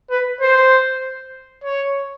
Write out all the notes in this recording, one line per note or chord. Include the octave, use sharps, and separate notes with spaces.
B4
C5
C#5